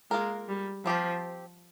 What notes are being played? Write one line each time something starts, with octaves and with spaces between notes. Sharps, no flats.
G#3 A#3 F4 A#4
G3
F3 C4 G4 C5